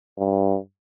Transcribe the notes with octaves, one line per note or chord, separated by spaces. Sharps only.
G2